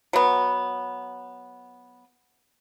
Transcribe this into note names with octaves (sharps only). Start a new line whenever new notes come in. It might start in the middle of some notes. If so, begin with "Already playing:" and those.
F#3 B3